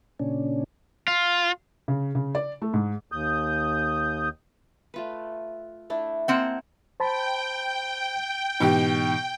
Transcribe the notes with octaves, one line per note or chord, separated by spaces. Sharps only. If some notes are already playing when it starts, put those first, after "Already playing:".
A#2 C#3 C#4 D4
F4
C#3
C#3
D5
A3
G#2
D#2 D#6 G6
A3 F4 B4
A3 D4 E4
A#3 C4 F#5
C5 G5 A5 B5
G#2 B2 E3 D#4 G4